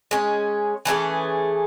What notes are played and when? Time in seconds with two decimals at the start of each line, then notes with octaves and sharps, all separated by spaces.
0.11 G#3 C#4
0.85 E3 A3 C#4 G#4